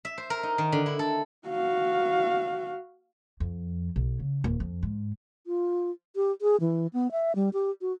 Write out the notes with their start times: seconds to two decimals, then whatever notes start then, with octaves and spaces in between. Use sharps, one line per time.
0.05 E5
0.18 C5
0.30 A#4
0.43 D#4
0.58 D#3
0.72 D3
0.86 E4
0.99 A4
1.48 F#4 F5
3.40 F2
3.96 B1
4.20 C#3
4.44 D#1
4.60 F2
4.83 G#2
5.47 F4
6.16 G4
6.42 G#4
6.60 E3
6.93 B3
7.12 E5
7.35 G3
7.53 G4
7.81 F#4